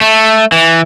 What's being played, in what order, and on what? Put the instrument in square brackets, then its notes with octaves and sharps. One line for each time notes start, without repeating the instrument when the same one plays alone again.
[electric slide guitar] A3
E3